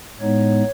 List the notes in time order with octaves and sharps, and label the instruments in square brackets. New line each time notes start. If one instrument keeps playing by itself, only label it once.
[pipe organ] A2 G#3 B3 D#4 C#5